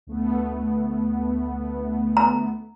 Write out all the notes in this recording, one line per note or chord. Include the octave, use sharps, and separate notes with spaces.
D2 A3 B3
A#5